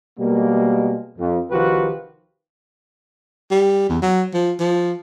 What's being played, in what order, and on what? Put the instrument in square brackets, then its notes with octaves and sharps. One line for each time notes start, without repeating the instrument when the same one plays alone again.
[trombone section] B2 G3 G#3 A#3
F2
C2 D#3 F3 F#4 G4 B4
[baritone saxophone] G3
E2
F#3
F3
F3